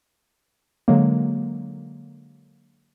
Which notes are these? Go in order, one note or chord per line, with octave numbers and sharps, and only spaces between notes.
D3 F#3 G#3 A#3